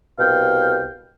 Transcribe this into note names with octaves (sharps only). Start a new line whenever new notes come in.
C2 B2 F5 G5